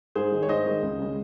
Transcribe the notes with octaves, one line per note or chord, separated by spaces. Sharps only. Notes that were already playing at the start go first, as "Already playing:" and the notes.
G#2 G#4 C5
D#3 G#3
C#5
G#2 C5 D#5
D#3 G#3
C#2
C#3 G#3